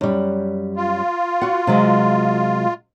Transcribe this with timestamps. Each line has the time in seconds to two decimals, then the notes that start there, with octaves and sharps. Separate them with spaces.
0.01 F#2 G3
0.77 F4
1.42 F#4 F#5
1.67 C3 F#3 G#3